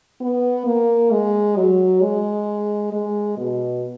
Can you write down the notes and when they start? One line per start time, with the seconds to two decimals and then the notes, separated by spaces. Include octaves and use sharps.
0.21 B3
0.66 A#3
1.11 G#3
1.56 F#3
2.02 G#3
2.92 G#3
3.37 B2